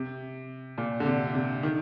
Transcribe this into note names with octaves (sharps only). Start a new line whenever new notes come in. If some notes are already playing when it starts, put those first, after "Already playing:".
Already playing: C3
A#2
D3
C3
C3
D#3